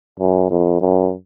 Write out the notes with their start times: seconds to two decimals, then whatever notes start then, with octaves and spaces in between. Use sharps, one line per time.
0.19 F#2
0.51 F2
0.81 F#2